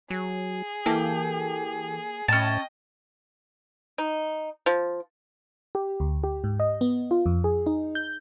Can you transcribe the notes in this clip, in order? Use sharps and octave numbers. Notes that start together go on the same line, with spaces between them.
F#3 G#4
E3 A#3 G4 A4
A2 C#4 D#5 G5 A5
D#4
F3
G4
D2
G4
G#2
D#5
B3
F4
F2
G#4
D#4
G6